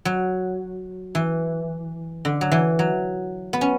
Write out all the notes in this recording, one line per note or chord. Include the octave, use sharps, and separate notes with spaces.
F#3
E3
D3
F#3
E3
F#3
B3
C#4